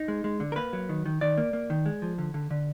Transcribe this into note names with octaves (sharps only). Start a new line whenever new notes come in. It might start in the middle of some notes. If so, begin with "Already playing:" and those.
Already playing: D#4
G#3
G#3
D3
A#4
A#3 B4
F#3
D#3
D#3
D#3 D5
A#3
A#3
D#3
G#3
F3
D3
D3
D3